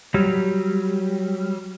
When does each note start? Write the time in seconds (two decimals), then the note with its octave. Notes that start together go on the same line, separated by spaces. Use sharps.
0.14 F#3 G3